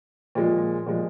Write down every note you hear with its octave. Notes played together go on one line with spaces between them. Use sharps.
A#2 F3 G#3
A#2 F3 G#3